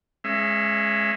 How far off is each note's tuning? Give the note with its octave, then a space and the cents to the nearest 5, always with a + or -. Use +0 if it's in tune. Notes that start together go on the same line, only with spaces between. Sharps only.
G#3 +10 C#4 -20 E5 +25